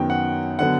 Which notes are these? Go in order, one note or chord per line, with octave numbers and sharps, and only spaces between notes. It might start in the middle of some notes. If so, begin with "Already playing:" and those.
Already playing: F#2 D#3 F#3 B3 G5
F#5
D3 F#3 B3 F#5